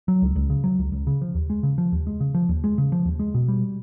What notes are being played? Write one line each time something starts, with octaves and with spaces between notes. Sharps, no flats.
F#3
C#2
C#2
C#3
F#3
C#2
C#2
C#3
F3
D#2
G#3
C#3
F3
D#2
G#3
C#3
F3
D#2
G#3
C#3
F3
D#2
G#3
B2
G3